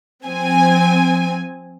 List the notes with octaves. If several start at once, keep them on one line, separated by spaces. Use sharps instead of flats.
F3 C4 G#5